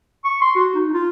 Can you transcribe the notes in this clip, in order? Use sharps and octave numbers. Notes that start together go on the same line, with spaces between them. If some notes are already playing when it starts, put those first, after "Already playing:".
C#6
C6
F#4
D#4
F4